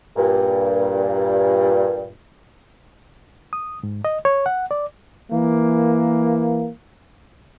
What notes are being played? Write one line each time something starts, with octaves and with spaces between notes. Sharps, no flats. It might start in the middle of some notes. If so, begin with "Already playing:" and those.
G2 A#2
D#6
G#2
D#5
C#5
F#5
D5
E3 A#3